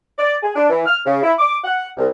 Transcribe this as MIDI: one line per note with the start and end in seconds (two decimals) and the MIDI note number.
0.18 0.36 74
0.43 0.52 68
0.56 0.68 62
0.70 0.82 52
0.86 0.99 89
1.06 1.21 49
1.23 1.33 64
1.39 1.56 86
1.64 1.88 78
1.97 2.06 36